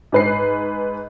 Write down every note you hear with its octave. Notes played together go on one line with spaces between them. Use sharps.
G#2 B4 C7